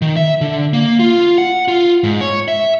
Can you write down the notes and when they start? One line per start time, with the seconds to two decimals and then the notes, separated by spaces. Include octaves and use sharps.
0.02 D#3
0.16 E5
0.41 D3
0.73 A#3
0.99 F4
1.38 F#5
1.68 F4
2.04 G#2
2.21 C#5
2.48 E5